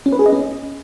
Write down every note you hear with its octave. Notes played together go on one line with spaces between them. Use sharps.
C#4
B4
G#4
D#5
C#4